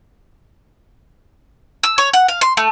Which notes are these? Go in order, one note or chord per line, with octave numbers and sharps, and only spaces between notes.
E6
C#5
F#5
F5
C6
A3